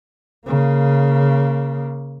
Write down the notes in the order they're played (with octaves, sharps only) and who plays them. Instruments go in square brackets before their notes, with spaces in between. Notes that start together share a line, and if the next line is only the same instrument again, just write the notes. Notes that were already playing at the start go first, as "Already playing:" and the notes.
[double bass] C#3 A#3